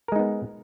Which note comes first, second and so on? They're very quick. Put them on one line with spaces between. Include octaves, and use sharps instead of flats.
A#4 G#3 D#4 B3